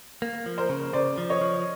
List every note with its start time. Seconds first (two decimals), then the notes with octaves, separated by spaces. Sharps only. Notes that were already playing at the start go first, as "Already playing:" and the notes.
0.22 A#3
0.46 F3
0.58 A#4 C5
0.69 C#3
0.93 C#3 C5 D5
1.18 F3
1.30 C#5 D#5
1.41 F3